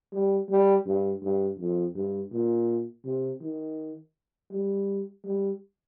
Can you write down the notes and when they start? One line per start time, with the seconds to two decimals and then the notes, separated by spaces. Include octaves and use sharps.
0.13 G3
0.49 G3
0.86 G2
1.22 G2
1.59 F2
1.95 G2
2.32 A#2
3.05 C3
3.41 D#3
4.51 G3
5.24 G3